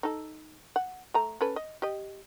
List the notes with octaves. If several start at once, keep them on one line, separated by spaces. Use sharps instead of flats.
D#4 A4
F#5
A3 A#5
C#4 A4 B4
D#5
G4 D#5